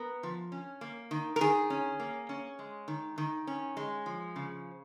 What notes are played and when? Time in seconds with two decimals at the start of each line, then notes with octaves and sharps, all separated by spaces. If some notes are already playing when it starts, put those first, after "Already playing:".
Already playing: B3 A#4
0.23 F3
0.52 C#4
0.81 A#3
1.11 D#3
1.36 A#4
1.41 D#3 G#4
1.70 C#4
2.00 A#3
2.29 C#4
2.59 G#3
2.88 D#3
3.18 D#3
3.47 C#4
3.77 G#3
4.06 F3
4.36 C#3